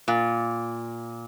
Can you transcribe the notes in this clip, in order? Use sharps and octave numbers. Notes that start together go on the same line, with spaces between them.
A#2